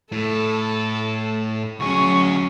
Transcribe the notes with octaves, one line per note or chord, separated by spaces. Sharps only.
A2 A4
D2 F#3 C#4 G#4 C#6